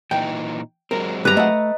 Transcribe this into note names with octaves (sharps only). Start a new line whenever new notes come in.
A#2 E3 D#4 G5
F#3 G#3 C4 A#4
G2 B4 A#5
A3 D#5 F#5